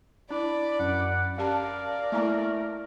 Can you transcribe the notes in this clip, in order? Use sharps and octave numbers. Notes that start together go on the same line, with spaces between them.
D4 E4 D5 B5
F#2 F#5
C#4 G4 A#4 D5 F5 A5
A3 A#3 E4 A#5